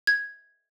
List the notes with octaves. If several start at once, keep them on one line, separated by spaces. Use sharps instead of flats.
G#6